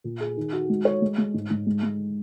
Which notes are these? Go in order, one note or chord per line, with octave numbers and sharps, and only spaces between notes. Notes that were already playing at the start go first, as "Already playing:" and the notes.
A#2
G#4
D#3
F#4
G#3
C#5
G#3
G#3
G#2
G#2
G#3
G#3